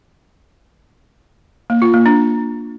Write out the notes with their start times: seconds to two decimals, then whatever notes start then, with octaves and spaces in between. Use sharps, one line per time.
1.70 A#3
1.82 F4
1.94 A#3
2.06 D4